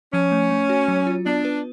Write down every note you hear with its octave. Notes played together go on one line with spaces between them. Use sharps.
F3 C#4
A3
A3
F#4
F#3
F4
B3 D4
B4